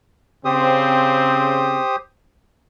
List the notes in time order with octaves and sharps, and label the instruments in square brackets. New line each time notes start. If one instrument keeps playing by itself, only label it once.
[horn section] C#3 C4 [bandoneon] G4 C5 D#6